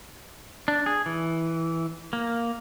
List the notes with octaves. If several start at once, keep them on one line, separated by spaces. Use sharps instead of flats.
D4
G#4
E3
A#3